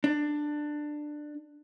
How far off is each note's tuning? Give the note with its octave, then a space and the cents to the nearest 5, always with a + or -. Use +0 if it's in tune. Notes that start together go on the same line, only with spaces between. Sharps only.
D4 +15